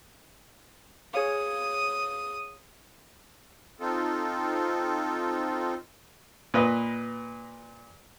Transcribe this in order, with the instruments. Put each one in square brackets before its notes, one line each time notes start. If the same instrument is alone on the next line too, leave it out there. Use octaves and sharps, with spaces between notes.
[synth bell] G#4 C#5 F5 [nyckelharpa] D#6
[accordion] C4 D#4 F4 A4
[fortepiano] A#2 B4 D#5